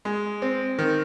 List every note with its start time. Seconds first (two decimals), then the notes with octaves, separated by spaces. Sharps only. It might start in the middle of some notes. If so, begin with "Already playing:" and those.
0.05 G#3
0.42 C4
0.79 D#3